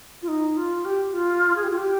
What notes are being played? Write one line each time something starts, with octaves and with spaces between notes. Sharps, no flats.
F4
D#4
F4
G4
F4
G#4
G4
F4
G4